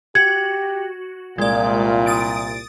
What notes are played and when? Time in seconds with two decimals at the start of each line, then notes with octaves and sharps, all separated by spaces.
0.15 F#4 G4 G#6
1.38 C2 A#2 G#3 F4 D5
2.06 D#6 A6 D7